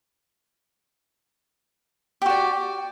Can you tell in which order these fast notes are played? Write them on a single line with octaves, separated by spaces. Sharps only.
G4 F#4 D5